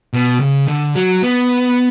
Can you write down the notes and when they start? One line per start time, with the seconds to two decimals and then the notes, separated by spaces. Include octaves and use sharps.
0.13 B2
0.40 C#3
0.68 D3
0.95 F#3
1.23 B3